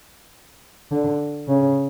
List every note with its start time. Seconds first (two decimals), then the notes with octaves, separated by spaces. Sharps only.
0.91 D3
1.48 C#3